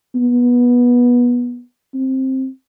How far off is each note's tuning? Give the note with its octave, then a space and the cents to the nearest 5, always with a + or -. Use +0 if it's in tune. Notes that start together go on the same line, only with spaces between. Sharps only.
B3 -20
C4 +10